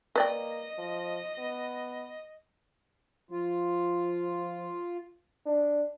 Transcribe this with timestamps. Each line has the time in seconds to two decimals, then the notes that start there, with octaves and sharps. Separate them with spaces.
0.16 A#3 B4 D5 D#5 G5
0.78 F3
1.38 B3
3.31 F3 F4
5.46 D4